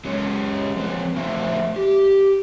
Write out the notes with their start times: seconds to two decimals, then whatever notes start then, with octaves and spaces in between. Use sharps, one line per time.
0.05 F#3 G#3 C#4 C#5
0.76 F3 C4 B4
1.16 F3 A3 D4 F#4 C5 E5
1.76 G4